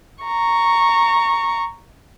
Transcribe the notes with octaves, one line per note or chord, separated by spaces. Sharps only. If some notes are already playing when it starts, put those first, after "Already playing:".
A#5 C#6